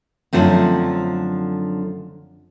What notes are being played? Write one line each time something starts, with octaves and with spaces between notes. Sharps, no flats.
F#2 D3 F3 A3 C4